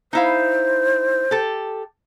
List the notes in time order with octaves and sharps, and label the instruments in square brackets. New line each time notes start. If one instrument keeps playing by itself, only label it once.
[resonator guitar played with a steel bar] D#4 E4 F5 [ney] C5
[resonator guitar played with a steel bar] G4 A4